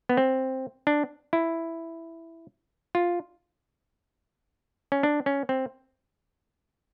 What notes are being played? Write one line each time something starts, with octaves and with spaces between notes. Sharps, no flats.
B3
C4
D4
E4
F4
C#4
D4
C#4
C4